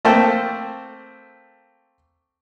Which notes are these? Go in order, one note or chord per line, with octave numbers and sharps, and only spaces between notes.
A3 A#3 C4 A4 C5 G5